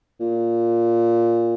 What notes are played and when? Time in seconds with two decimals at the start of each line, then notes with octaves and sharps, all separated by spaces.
0.21 A#2